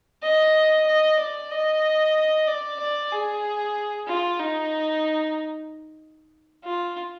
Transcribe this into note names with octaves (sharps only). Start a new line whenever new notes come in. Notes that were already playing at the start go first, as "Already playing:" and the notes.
D#5
D#5
D5
D#5
D5
D5
G#4
F4
D#4
F4